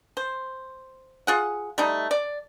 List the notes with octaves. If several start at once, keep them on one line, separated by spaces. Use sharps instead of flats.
C5
F4 G#4 F#5
G3 A3 D#4
D5